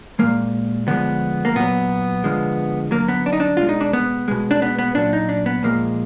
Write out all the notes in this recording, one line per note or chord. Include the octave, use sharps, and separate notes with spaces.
A#2 F3 G#3 A#3
D3 F3 G#3 B3
A#3
A#2 F#3 B3
D3 F3 G#3
D3 F#3 A#3
B3
D4
D#4
D4
B2 G#3 F4
D#4
D4
B3
B2 G#3
D4
B3
B3
A#2 F#3 D4
D#4
D4
B3
A#2 F3 G#3 A#3